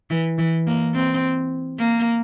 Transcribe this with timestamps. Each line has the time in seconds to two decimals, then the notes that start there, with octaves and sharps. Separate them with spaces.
0.10 E3
0.38 E3
0.67 A#3
0.94 C4
1.79 A#3